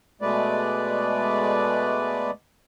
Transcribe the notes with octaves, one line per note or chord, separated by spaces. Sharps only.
B2 G#3 A3 B4 D5